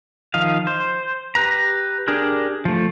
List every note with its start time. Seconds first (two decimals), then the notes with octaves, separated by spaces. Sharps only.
0.34 D#3 F3 D#5 F5
0.67 C5
1.35 G4 B4 A#5
2.08 D4 G4 G#4 A#4
2.65 F3 A3